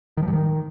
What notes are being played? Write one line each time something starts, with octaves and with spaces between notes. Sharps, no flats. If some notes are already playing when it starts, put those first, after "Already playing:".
D#3
F3
G2
D#3